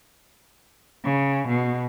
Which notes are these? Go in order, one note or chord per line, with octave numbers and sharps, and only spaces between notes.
C#3
B2